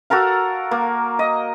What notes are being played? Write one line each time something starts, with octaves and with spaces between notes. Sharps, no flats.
F#4 A4 A#4 F5
A#3
D#5